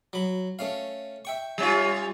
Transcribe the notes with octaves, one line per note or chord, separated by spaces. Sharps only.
F#3 B5
A3 C#4 F5
E5 G5 C#6
G3 C#4 F4